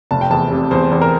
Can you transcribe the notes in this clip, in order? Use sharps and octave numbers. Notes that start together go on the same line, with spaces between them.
F1 A5
G5
E2 A5
C3
E2 C5
E2
A#4